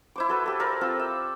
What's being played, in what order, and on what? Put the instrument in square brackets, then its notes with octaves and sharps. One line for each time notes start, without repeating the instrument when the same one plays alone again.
[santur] E4 C5 D6
F#4 A4 B4
G4 A4
A#4 C5 D5 F5
C4 F4 A4
E5